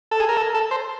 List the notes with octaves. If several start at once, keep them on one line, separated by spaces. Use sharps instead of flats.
A4
G#4
A#4
A4
A4
C5